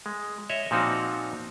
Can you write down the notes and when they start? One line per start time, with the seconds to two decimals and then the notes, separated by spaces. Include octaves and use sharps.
0.06 G#3
0.50 C#5 D#5 E5
0.71 A#2 F3 C4 D#4 F#4